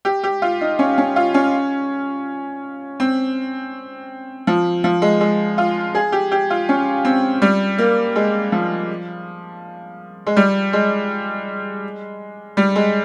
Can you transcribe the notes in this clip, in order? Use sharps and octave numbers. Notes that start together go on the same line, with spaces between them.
G4
G4
F4
D#4
C#4
C#4
F4
C#4
C4
F3
F3
G#3
G#3
F4
G#4
G4
G4
F4
C#4
C4
G3
A#3
G#3
F3
G#3
G3
G#3
G3
G#3